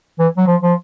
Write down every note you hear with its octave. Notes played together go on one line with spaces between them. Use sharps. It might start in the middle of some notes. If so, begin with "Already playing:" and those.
E3
F#3
F3
F3